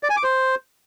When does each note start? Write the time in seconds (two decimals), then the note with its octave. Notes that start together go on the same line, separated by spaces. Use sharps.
0.03 D5
0.10 G#5
0.17 D6
0.23 C5